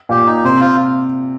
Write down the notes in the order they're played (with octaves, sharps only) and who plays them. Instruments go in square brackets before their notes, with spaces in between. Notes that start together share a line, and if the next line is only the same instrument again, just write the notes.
[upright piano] A#2 [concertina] G4
[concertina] D#4
[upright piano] C3 [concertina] C5
[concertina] F4